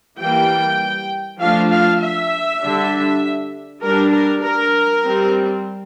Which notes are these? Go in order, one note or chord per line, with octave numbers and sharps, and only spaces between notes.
E3 G3 A#3 G5
F3 A3 D4 F5
F5
E5
D3 G3 D4
G3 D4 A#4
A#4
A#4
G3 C4